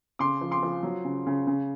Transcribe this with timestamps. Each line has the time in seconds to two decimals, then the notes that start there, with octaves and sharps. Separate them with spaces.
0.19 C#3 C6 D6
0.41 F3
0.51 C6 D6
0.63 F3
0.83 F#3
1.05 C#3
1.27 C#3
1.47 C#3